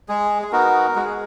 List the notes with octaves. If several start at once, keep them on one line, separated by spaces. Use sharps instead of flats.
G#3 G#4
G#4
B3 D#4 F#4 A#4
G#3 F#4
G#4